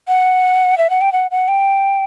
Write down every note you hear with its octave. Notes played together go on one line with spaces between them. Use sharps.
F#5
E5
F#5
G5
F#5
F#5
G5